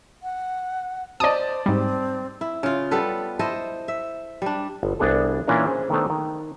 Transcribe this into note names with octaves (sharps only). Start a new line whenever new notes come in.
F#5
C5 D5 D#5 A5 D#6
G#2 G3 C4
E4
C#3 F4
G3 B3 A4 B4
E4 A4 C5 D#5
E5
G3 D4
G1
C2 B3 D4 G#4 A4
A#2 E3 C#4 D4 E4 A#4
C#4 G#4 C5
D#3 A3 B3 D4 A4 C5
D#3